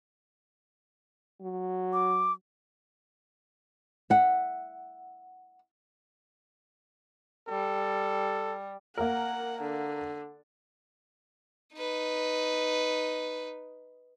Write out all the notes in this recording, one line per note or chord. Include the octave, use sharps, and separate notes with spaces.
F#3
D6
E5 F#5
G3 A4
A#3 A#4 F#5
D3
D#4 B4